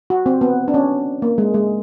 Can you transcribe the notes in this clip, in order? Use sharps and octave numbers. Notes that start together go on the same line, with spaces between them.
F#4
C4
B3
D4
C#4
A#3
G#3
G#3